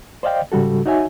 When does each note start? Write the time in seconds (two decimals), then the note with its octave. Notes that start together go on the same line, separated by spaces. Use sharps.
0.23 C5 D5 D#5 F5 G5
0.52 G#2 C#3 G3 F#4 A4
0.86 D#4 F#4 C#5 E5 G#5